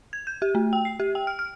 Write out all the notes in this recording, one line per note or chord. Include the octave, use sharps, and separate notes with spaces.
G#6
G6
G4
A3
G5
C7
G4
G5
F6
F6